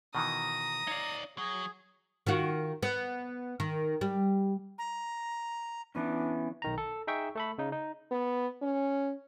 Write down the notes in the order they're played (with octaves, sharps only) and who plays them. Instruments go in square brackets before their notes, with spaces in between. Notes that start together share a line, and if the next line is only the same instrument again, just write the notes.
[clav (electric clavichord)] B2 D#3 E3 [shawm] A#5 [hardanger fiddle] D#6
[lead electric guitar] D#4 D5 [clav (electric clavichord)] C#5 F5
[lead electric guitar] F#3 [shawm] G#4
[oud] D#3 F4 F#4
B3
D#3
G3
[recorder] A#5
[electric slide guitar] E3 B3 C#4 [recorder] D4
[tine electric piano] B1 D#3 A#5
A4
D#4 G#4 E5 G5 C#6
A3 A4 B5
C#3 D#4
D#4
[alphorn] B3
C#4